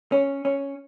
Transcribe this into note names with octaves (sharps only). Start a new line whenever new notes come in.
C#4
C#4